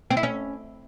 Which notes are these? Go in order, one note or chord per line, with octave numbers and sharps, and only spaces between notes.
C4
E4
C#4